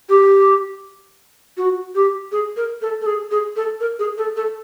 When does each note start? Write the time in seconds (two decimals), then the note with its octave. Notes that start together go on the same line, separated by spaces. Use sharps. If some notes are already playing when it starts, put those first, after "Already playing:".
0.09 G4
1.57 F#4
1.95 G4
2.32 G#4
2.57 A#4
2.82 A4
3.01 A4
3.06 G#4
3.31 G#4
3.56 A4
3.81 A#4
3.99 G#4
4.18 A4
4.36 A4